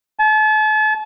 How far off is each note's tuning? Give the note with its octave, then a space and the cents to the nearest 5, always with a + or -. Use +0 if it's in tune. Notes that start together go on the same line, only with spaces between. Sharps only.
A5 -40